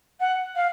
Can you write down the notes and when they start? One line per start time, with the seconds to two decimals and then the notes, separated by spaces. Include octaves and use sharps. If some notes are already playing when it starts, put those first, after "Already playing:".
0.20 F#5
0.55 F5